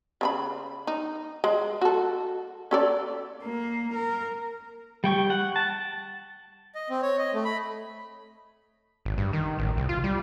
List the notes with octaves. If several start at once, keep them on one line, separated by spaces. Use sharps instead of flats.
C#3 D4 B5
D#4
G#3
F#4 A4
C#4 A4 D5
A#3
A#4
G3 G5 C#6
F#5
A5
D#5
C4
C#5
D#5
A3
B5
G#1
G2
D#3
A1
C2
F4
G3